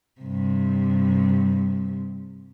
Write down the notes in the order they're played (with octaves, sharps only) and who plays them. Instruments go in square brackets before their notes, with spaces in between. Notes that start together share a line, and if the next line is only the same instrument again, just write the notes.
[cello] G2 C3